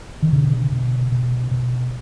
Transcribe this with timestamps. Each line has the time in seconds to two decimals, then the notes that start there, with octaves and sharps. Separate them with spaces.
0.22 D#3
0.33 B2 D3
0.72 B2
1.12 B2
1.51 B2